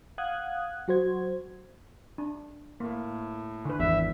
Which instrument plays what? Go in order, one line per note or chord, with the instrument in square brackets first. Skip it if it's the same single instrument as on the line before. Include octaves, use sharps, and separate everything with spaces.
[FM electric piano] F5 F#5 D#6 F#6 G#6
F#3 F#4 C5 G#6
[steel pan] D4
[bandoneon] A2 [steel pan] A#3
[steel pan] D3 B4
[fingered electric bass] G#1 E2 [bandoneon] E5